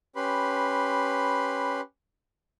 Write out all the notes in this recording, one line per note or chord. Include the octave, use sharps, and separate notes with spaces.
C#4 G4 B4 B5 C6